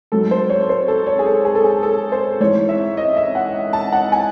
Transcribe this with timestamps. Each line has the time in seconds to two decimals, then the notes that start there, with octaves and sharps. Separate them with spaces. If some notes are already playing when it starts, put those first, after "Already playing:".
0.12 G#2 F#3 A4
0.31 C5
0.49 C#5
0.69 C5
0.88 A4
1.07 C#5
1.19 G#4
1.26 A4
1.45 G#4
1.55 A4
1.64 G#4
1.83 A4
2.12 C5
2.40 G#2 E3 C#5
2.69 E5
2.97 D#5
3.17 E5
3.35 F#5
3.73 A5
3.93 F#5
4.12 G#5